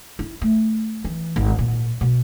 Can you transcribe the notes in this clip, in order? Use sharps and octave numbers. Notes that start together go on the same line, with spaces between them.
E4
A3
E3
G#1
A#2
B2